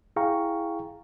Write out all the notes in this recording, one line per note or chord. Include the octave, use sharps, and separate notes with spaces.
E4 G#4 F5 G5 A#5 C#6